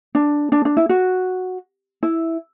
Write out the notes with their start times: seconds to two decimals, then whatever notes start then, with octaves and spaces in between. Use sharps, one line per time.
0.15 D4
0.52 D4
0.65 D4
0.77 E4
0.89 F#4
2.03 E4